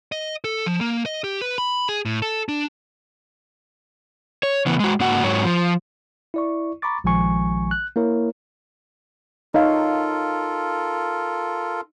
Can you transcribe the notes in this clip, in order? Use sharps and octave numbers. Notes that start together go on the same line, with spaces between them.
D#5
A4
F3
A#3
D#5
G4
B4
B5
G#4
A2
A4
D4
C#5
C#3 E3 B3
G#3 F#4
G#2 A#3 F#4 F#5
G#2 F#3 C#5
F3
E4 D5 C#6
A#5 B5 C#6 D6 A6
A#1 D#3 F3 G#3 G#5 C#6
F#6
A#3 E4 A#4 C#5
D#4 F4 A4 A#4 C#5 F5